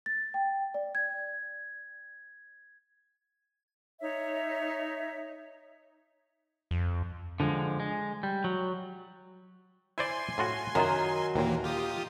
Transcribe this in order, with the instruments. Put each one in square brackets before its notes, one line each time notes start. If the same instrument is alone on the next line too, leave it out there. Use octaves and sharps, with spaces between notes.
[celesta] A6
G5
D5
G#6
[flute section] D#4 C#5 E5
[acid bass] F2
[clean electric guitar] D3 F3 G3 G#3
G#3
G3
F#3
[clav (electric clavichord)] E4 C5 D5 [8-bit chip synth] G#5 C6
[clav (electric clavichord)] A2 F4 F#4
[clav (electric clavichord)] F#2 F4 [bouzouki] D#3 F#3 A#4
[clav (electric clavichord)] D#2 A#2 [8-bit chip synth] E3 A#3
[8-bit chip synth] F4 G4 D#6